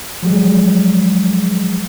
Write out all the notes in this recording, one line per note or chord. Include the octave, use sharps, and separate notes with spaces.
F3 F#3 G#3